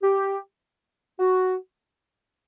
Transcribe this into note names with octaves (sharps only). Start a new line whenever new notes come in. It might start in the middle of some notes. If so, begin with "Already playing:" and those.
G4
F#4